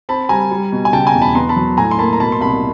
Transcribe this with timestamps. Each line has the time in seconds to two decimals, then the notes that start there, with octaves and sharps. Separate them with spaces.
0.09 C4 A5 B5
0.29 G3 G#5 A#5
0.51 G3
0.72 B2
0.85 G#5
0.93 C#3 G5 A5
1.07 G#5 A#5
1.14 E2
1.22 A5 B5
1.35 B3 A#5 C6
1.49 A5 B5
1.56 F#3
1.77 A2 G#5 A#5
1.91 C6
1.99 A#3 A5 B5
2.13 A#5
2.20 B2 A5 B5
2.32 C6
2.41 C2 A5 B5